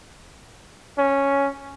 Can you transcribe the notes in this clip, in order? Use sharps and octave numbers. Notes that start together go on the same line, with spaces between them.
C#4